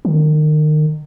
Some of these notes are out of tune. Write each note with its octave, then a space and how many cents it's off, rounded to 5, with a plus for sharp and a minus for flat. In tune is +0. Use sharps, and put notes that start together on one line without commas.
D#3 -30